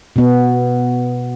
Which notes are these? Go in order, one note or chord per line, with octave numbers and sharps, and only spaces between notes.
B2 B3